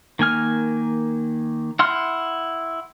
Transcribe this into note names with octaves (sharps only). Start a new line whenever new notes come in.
D#3 A#3 G#5 F6
E4 F#5 C6 F6